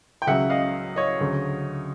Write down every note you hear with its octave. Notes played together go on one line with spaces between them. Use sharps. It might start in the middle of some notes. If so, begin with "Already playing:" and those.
G5
C#2 C#3 F#3 E5 F#5
D#5 F5
C#5 D#5
D2 C#3 F#3